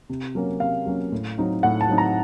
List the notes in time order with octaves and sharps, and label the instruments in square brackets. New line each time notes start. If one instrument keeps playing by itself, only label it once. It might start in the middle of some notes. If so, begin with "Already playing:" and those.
[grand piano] C3
F#3 A#3 C#4
C3 F5
F#3 A#3 C#4
A2
F#3 C4 D#4
A2 F#5
A5
F#3 C4 D#4
A#5